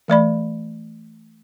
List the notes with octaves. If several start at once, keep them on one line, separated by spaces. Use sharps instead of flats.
E3 A3 D5 B5